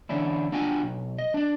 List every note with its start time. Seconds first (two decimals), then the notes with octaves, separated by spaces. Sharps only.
0.09 D3 E3 C#4 D4 E4
0.52 D4 F4 F#4 G5 G#5
0.83 B1
1.18 D#5
1.34 D4 D5